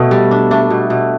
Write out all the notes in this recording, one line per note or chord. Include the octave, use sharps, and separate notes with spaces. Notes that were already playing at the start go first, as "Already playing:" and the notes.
Already playing: B2 A3
G3
D4
A3 D4
B2
B2